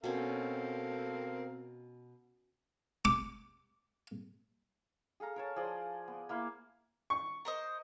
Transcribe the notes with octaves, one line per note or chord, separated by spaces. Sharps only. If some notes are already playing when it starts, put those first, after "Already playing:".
B2 C4 C#4 A4 A#4 F5
D6
G#4 A4 F5 A#5
A#4 C#5 A5
F3 G#4 D5 C6
B3
A#3 E4 F5
C#6
A#4 C5 D#5